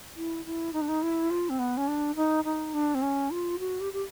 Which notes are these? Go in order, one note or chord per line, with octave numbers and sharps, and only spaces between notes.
E4
E4
D#4
D4
D#4
E4
F4
C4
B3
C#4
D4
D#4
D#4
D4
C4
C#4
F4
F#4
G4
G4